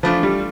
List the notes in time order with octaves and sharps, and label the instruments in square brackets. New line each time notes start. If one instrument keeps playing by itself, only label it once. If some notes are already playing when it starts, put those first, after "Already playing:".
[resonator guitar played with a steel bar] E3 A3 D4 F4 [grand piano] F3
[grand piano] G3